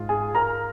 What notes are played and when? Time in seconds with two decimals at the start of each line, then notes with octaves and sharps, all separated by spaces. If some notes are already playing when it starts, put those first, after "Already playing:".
Already playing: G#2 G#3 F4
0.09 G#4 G#5
0.35 A#4 A#5